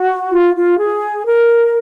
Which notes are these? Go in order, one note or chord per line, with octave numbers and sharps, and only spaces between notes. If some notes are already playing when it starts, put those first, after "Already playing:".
Already playing: F#4
F4
F4
G#4
A#4